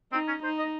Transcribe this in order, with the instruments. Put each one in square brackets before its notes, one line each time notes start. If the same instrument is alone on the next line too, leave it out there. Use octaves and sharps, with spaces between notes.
[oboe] C4 [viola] D#4
[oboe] C#4
[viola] D#4 [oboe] C5
[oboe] D#5